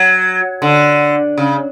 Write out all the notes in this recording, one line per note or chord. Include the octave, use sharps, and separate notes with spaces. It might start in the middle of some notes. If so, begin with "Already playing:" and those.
Already playing: F#3
D3
C#3